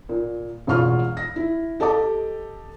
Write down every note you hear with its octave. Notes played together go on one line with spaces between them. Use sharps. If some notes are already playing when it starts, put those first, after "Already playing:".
A#2
E1 A1 E2 F4 C#6 F6
A#6
E4
G4 A4 D#5 A5 D6